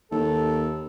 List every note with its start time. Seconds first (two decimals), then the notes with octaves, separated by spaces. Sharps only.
0.11 D#2 A4